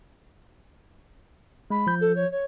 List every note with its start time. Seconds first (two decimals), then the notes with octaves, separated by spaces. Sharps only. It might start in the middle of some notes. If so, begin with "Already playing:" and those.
1.70 G#3 B5
1.87 F3 G6
2.01 A4
2.15 C#5
2.31 C#5